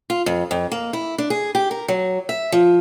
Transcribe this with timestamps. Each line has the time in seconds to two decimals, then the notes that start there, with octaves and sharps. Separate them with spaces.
0.10 F4
0.26 F2
0.51 F2
0.72 A#3
0.93 E4
1.18 D4
1.30 G#4
1.55 G4
1.71 A#4
1.88 F#3
2.29 E5
2.52 F3